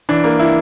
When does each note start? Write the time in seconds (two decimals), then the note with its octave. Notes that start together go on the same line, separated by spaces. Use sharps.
0.09 E3 D4
0.24 A#3
0.39 E4